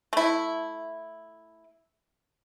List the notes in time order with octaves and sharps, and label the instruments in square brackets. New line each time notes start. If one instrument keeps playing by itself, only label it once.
[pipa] A3 E4